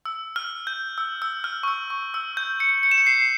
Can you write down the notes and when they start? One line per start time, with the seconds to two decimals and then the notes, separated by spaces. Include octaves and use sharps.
0.05 E6
0.36 F6
0.67 G6
0.98 E6
1.22 E6
1.44 F6
1.63 C#6
1.68 E6
1.90 C#6
2.14 E6
2.37 G6
2.60 C#7
2.83 C#7
2.91 E7
2.98 C#7
3.07 C7